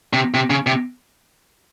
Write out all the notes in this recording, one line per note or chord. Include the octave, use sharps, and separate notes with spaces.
C3
C3
C#3
C3